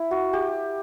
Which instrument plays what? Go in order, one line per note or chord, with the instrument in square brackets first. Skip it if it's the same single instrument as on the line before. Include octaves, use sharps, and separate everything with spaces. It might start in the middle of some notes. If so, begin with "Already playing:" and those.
Already playing: [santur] E4
F#4
G4